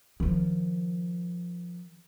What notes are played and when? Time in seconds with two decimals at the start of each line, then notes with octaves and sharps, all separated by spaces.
0.20 D#3 F3